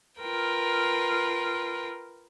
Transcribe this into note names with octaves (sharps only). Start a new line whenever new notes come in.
F4 A#4 B4 G5